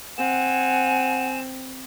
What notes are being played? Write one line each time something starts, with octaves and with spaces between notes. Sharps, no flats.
C4 F#5 G#5 E7